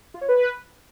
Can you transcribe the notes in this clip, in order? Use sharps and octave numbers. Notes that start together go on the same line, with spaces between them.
F4
C#5
B4